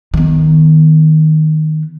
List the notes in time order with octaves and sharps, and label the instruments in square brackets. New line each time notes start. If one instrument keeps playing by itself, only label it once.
[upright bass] D#3 B3